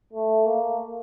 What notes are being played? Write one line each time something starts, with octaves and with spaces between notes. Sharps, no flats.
A3
A#3